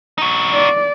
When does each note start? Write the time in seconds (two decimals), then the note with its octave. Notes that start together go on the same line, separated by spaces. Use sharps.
0.18 D#4 F#4
0.53 D5